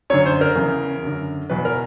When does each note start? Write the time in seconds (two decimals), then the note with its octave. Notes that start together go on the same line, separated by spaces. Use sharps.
0.10 F#2 D3 C#5
0.26 C5
0.41 A#4
0.56 E2 C#3 E3
1.03 F#2 D3
1.50 E2 B2 B4
1.65 A#4